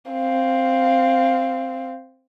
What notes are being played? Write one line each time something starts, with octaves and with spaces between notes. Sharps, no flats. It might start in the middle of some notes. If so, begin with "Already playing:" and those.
C4 F5